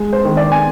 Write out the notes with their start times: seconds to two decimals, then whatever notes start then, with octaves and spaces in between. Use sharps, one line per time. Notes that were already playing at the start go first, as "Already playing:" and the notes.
Already playing: G#3
0.13 C5
0.25 D#3
0.37 D5
0.52 G#5